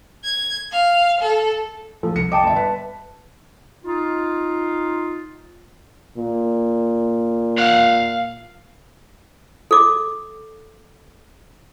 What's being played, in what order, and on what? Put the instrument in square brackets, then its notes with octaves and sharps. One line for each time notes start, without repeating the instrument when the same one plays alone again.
[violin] G#6
F5
A4
[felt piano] F3 [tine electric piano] A4
[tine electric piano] C2 [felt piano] C#7
[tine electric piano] D#5 G5 A5 [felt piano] D6
[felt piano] G1 E5 [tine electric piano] A5
[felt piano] B4
[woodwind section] D#4 F4
[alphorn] A#2
[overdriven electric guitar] F5 F#5
[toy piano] A4 D6